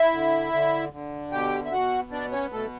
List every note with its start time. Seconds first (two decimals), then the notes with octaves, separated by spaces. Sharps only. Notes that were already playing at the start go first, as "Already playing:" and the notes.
Already playing: E4 E5
0.13 D3
0.53 D3
0.93 D3
1.32 B2 G4 G5
1.65 E5
1.72 B2 F#4 F#5
2.12 B3 D4 D5
2.32 C#4 C#5
2.52 B2 A3 A4